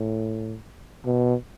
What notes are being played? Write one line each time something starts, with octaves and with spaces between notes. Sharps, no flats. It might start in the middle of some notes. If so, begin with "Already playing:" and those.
Already playing: A2
B2